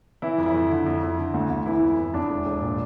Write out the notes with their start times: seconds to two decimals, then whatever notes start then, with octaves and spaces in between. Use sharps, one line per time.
0.22 E3 E4
0.38 F2
0.46 E4
0.54 F2
0.70 D3
0.86 F2
1.02 F2
1.18 D3
1.34 D2
1.50 D2
1.66 E3 E4
1.82 F2
1.98 F2
2.14 E2 D4
2.30 E1
2.46 E1
2.62 A#2